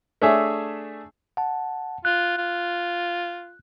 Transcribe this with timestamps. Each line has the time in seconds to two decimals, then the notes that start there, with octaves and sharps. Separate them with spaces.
0.22 A3 D4 G#4 C#5 E5
1.37 F#5 A5
2.05 F4 F#6
2.38 F4